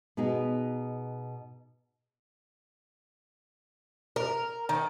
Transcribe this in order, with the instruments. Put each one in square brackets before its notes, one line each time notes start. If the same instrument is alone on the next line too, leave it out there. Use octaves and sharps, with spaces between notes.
[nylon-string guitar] B2 B3 D#4 G#4
[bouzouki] A#4
D#3